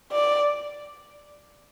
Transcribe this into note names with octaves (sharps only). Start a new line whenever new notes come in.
D5